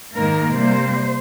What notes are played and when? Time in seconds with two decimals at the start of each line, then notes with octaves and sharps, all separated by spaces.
0.14 G#2 D#3 A#3 A#4
0.53 C3 G3 A#3 C5